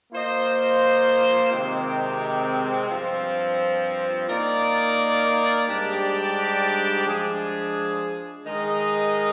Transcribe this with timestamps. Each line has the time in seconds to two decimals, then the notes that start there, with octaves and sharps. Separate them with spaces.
0.13 A#3 F4 C5 D#5
1.51 C3 D#3 G#3 C4 G4
2.90 G2 F3 C4
4.29 A#3 D#4 A#4 D5
5.68 G#2 G3 D4 G4 D5
7.07 F3 G#3 D4 G#4
8.46 D#3 G#3 D#4 A#4 D#5